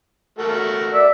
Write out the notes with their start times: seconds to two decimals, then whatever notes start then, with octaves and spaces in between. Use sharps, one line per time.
0.39 A3 A#3 F#4
0.93 D5 E5